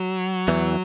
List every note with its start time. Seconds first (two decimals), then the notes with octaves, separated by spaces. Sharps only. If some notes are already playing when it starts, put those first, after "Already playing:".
Already playing: F#3
0.48 E2 E3